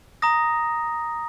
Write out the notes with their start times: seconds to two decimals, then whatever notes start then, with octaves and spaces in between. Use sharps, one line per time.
0.22 A#5 D#6 A#6